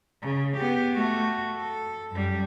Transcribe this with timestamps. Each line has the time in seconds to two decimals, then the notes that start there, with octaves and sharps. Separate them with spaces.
0.23 C#3
0.57 B3 G4
0.94 A3 F#4
1.56 A4
2.11 F#2 G3